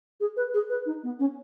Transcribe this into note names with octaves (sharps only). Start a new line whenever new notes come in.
G#4
B4
G#4
B4
D#4
B3
C#4